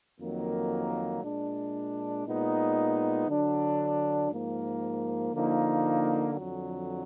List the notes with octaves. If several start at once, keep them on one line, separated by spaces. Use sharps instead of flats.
F2 D#3 F#3 A#3
A#2 G#3 D4
A#2 G#3 B3 D#4
D3 F#3 D4
G#2 F3 A#3
D3 F3 A#3 D#4
F2 D3 F#3